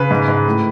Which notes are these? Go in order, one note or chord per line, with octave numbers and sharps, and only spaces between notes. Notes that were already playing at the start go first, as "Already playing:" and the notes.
Already playing: C#3 B4
G#2
G#2
A2